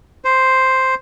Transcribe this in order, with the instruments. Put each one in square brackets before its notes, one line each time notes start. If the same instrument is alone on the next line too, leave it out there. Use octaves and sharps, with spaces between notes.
[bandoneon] C5